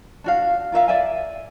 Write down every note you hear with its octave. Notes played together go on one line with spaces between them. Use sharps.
D4 F#4 F5
F4 A#4 E5 F5
D5 E5 G#5